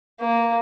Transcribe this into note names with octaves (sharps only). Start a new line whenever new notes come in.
A#3